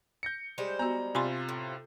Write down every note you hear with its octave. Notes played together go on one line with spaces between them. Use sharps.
G6 A#6 C#7
G3 G#3 C5
B3 F#4 A#5
C3 F4 G#5 B5 C6
A2